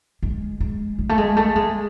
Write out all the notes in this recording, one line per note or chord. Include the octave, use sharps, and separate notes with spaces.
G#3
G#3
G#3
A3
G#3
A3
G#3